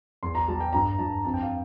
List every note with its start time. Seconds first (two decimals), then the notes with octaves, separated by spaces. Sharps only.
0.23 E2 C6
0.35 A#5
0.48 G3 A5
0.60 G5
0.73 G2 A#5
0.99 G2 A5
1.24 F2 A5
1.34 G5
1.43 F5